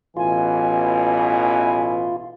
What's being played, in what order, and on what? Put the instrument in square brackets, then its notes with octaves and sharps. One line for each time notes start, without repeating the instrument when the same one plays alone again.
[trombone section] A1 B2 E3 [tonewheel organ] F4 [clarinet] G#5